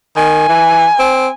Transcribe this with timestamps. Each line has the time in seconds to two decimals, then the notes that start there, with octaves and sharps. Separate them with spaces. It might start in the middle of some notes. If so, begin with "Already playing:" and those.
0.17 D#3 G#5
0.49 E3
0.99 C4